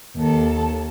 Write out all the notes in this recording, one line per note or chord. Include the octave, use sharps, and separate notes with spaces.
D#2 A4